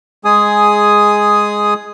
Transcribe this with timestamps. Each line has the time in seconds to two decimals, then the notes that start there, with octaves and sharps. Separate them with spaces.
0.25 G#3 G#4 G#5 D#6